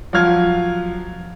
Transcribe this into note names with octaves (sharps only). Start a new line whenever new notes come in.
F3 F#3 F4 F6 G#6